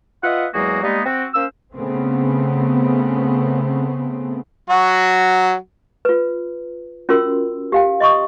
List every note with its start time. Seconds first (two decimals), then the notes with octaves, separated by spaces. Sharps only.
0.23 F4 B4 D#5 E5 F#5
0.54 E2 F#3 G#3 A#3 F#4 G#4
0.83 G3 G#3 A#3 B3 D#4
1.05 C4 F#4
1.34 A#3 C#4 C5 E6
1.76 C#3 A3 B3 C4
4.70 F#3 F#4
6.05 F4 B4
7.09 C#4 F4 F#4 A#4 C6 E6
7.72 G4 F5 G5
8.00 D#5 C6 C#6 D#6